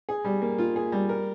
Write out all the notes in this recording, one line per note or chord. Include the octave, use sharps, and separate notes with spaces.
G#4
G3
A#3
F4
G#4
G3
A#4